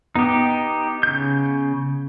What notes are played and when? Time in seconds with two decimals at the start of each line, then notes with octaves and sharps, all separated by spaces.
0.15 B3 D#4 G4
1.03 C#3 G6